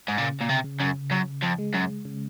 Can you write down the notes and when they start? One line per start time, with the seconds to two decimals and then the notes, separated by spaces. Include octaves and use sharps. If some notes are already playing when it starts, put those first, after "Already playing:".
0.08 G#2
0.18 A#2 C#3
0.41 A#2
0.49 C3
0.64 C#3
0.80 F#2
1.11 F#2 C#3
1.42 F2
1.58 G#3
1.74 F#2
2.05 C#3